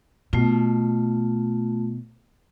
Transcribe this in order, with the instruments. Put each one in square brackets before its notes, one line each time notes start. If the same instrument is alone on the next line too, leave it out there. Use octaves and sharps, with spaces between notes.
[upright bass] B2 [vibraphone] A3 F4